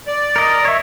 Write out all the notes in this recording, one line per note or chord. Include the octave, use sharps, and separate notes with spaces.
D5
A#4 D#5
C#5 E5